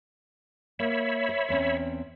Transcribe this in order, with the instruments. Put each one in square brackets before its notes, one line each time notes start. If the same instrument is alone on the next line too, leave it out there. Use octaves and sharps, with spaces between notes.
[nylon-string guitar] A#3 [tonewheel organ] C#5 E5 B5
[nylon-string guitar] C5
E2 C4 C#4